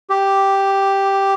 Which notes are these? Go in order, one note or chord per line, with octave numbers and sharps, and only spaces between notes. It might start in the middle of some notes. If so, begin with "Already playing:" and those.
G4